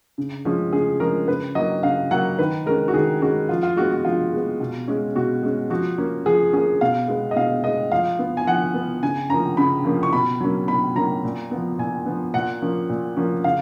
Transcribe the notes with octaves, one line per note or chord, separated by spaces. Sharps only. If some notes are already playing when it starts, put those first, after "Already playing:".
C#3
F3 G#3 C#4
C#3 G#4
F3 G#3 C#4 A#4
C#3 B4
F#3 A#3 D#5
C#3 F5
F#3 A#3 F#5
D#3 B4
G#3 C#4 A#4
F#4
D#3 G#4
G#3 C#4 F#4
F3 F4
F4
G#3 B3 F#4
F#4
F3 F4
G#3 B3
B2
G#3 C#4
B2 F#4
G#3 C#4
F3 F#4
A#3 C#4
F3 G#4
A#3 C#4 G#4
B2 F5
G#3 B3
D#5
B2 F5
G#3 B3 D#5
F3 F5
B3
G#5
F3 F#5
B3
C#3 G#5
F3 A#3 C#4 A#5
C#3 B5
F3 A#3 C#4
C#6
B2 B5
F#3 A#3 C#4
B2 B5
F#3 A#3 C#4 A#5
A#2
F3 B3
A#2 G#5
F3 B3
A#2 F#5
F3 A#3 C#4
A#2
F3 A#3 C#4
C#3 F5